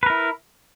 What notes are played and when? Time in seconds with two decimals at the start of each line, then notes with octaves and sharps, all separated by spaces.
0.03 B4
0.06 A#4
0.10 E4